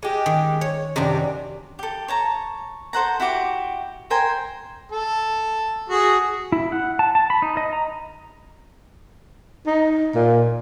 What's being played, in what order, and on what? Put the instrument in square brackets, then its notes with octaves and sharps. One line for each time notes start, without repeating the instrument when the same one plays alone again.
[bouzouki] G#3 G4
[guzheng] D#3
C#5
[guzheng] F#2 D#3 D4 [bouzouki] C3 G4
[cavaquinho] G4 A4
C#5 A5 A#5
A4 C5 F#5 A#5
E4 F#4 G4 D6
A#4 C5 G5 G#5
[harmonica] A4
F#4 G#4
[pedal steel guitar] E4
F#5
A5
A5
B5
D#4
D#5
A#5
[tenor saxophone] D#4
A#2